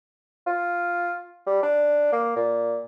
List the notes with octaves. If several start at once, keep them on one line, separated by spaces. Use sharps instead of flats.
F4
G3
D4
A#3
A#2